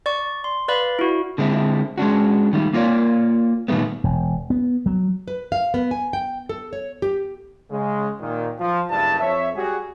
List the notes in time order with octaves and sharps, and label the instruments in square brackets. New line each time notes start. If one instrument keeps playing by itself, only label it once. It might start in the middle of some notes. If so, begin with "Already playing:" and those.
[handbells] D5 C#6
C6
B4 D5 F5 B5
E4 F#4
[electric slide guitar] D3 G#3 C4 E4
G#3 C#4 D4 F#4
D#3 G3 A3
A#3 F4 A#4 C#5 D5
A#2 D#3 G3 A3 B3
[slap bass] E1
B3
F#3
[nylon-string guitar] B4
F5
B3
G#5
G5
A4
C#5
G4
[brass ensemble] C#3 G#3
A#2 D#3
F3
F#1 G2 A5
F2 C#5 E5
G3 F#4 G#4